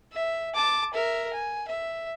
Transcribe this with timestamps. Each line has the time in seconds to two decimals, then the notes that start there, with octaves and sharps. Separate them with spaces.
0.13 E5
0.55 A5 D6
0.94 A#4 E5
1.34 G#5
1.68 E5